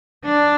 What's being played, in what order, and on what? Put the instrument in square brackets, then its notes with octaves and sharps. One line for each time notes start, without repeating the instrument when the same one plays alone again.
[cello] D4